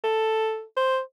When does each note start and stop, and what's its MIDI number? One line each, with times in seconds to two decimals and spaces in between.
0.04 0.63 69
0.77 1.00 72